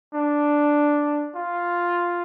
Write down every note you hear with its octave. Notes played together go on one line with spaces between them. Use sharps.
D4
F4